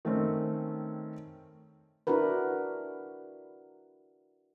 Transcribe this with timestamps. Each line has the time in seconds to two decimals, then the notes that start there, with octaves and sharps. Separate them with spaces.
0.05 D#3 A3 C4 C#4
2.07 D4 E4 F#4 A#4 B4